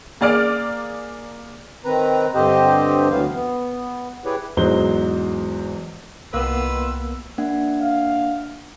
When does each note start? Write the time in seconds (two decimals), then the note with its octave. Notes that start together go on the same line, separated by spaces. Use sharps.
0.21 A#3 G#4 D5 F6 D7
1.84 D#3 C4 B4 A#5
2.35 G2 D3 C4 G4 C5 D#5
3.10 D2 E3 F#3 B3 F5
3.33 B3
4.25 E4 G4 G#4 B4 C#5 D5
4.57 E2 G#2 F#3 G#4 C5 G7
6.34 C2 D#3 A#3 B3 F4 B4 C6 E6
7.38 A#3 D4 F#5
7.80 F5